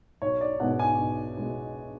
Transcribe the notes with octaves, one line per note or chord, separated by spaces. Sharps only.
B1 C#5
D5
B2 G#3 B3 F#5
G#5
B1
B2 G#3 B3